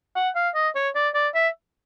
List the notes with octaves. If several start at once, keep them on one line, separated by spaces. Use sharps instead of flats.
F#5
F5
D#5
C#5
D5
D5
E5